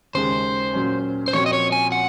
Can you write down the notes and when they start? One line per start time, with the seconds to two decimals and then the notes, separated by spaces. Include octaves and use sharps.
0.14 D#2 C#3 G#3 C5
0.74 A#2 F#3 C#4
1.28 C5
1.33 A#2 F3 C4 F#4 C#5
1.46 D#5
1.53 C#5
1.72 G#5
1.92 F#5